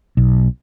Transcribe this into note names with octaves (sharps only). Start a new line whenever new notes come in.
B1